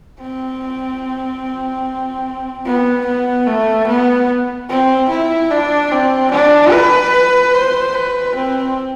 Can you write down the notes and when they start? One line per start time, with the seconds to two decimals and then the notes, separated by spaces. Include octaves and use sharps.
0.21 C4
2.65 B3
3.06 B3
3.47 A3
3.87 B3
4.69 C4
5.09 E4
5.50 D4
5.91 C4
6.32 D4
6.72 B4
7.54 C5
7.95 B4
8.35 C4